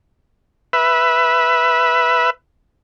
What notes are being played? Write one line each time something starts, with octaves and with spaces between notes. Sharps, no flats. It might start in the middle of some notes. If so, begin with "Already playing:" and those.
B4 E5